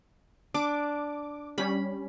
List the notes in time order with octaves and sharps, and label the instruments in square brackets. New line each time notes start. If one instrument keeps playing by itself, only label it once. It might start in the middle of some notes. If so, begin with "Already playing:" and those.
[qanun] D4 [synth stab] D6
[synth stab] G3 C#4 [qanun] B5